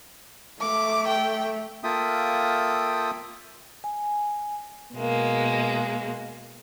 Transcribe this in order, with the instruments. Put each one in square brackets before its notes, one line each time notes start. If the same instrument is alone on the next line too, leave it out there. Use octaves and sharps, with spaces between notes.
[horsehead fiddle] A3 [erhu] D6
[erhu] G5
[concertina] A#3 F4 A4 E5 G5 D#6
[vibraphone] G#5
[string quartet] B2 G#3 A#3